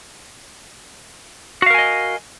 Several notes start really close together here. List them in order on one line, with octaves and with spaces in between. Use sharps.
F#4 F5 A#4 G#5 D#5